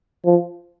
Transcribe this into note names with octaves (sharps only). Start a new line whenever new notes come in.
F3